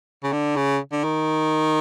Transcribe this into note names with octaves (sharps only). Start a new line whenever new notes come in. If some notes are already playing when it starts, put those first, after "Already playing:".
C#3
D3
C#3
D3
D#3